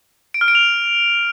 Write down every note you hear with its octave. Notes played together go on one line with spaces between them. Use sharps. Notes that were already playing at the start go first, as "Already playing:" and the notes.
D7
F6
D7
F7